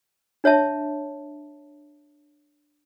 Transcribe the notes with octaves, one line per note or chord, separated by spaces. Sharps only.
D4 C#5 E5 A5